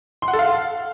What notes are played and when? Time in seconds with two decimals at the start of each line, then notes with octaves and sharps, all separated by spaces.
0.22 C6
0.28 F#5
0.33 A4
0.39 F5